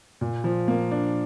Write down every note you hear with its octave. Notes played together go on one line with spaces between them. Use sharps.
A#2
F3
A#3
D4